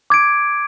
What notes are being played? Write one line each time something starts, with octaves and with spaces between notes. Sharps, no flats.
D6 G#6 D7